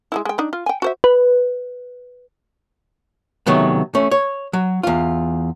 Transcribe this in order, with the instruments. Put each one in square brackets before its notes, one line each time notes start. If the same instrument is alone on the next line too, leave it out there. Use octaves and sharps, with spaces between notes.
[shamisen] G#3 A#3 E4
G#3 G5
D4 D#4
F4
G5 G#5
F#4 C5 E5
[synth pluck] B4
[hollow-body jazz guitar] C3 D#3 F#3 A3 B3
A3 C#4
C#5
F#3
E2 F4